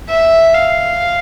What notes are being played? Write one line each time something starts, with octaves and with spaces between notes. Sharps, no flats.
E5
F5